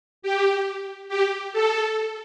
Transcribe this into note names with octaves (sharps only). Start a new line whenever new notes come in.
G4
G4
A4